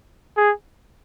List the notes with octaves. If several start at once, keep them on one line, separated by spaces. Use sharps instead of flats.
G#4